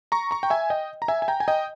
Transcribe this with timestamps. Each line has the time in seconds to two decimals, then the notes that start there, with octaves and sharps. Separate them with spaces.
0.12 A#5 C#6
0.31 A#5 C#6
0.43 G5
0.50 E5 G#5
0.70 D#5 G5
1.02 A#5
1.08 E5 G#5
1.22 G#5
1.28 G5 A#5
1.40 G#5
1.48 D#5 G5